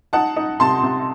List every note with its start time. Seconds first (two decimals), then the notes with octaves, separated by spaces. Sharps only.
0.13 D#4 F#5 A5
0.36 D#4
0.60 C3 A5 C6
0.83 C3